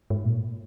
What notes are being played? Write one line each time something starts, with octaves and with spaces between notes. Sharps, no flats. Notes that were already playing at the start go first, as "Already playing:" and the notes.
G#2
A#2